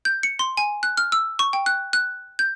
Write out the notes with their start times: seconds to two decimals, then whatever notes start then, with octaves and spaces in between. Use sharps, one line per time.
0.05 G6
0.23 C#7
0.39 C6
0.57 G#5
0.83 F#6
0.97 F6
1.12 E6
1.39 C#6
1.53 G5
1.66 F#6
1.93 F#6
2.39 G6